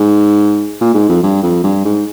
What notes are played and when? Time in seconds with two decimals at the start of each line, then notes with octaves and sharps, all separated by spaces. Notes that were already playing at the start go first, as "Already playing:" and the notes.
Already playing: G#2
0.81 A#2
0.94 G#2
1.09 F2
1.23 G2
1.43 F2
1.64 G2
1.85 G#2